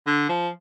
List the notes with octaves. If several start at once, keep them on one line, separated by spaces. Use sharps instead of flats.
D3
F3